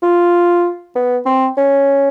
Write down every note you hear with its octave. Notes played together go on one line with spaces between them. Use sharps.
F4
B3
C4
C#4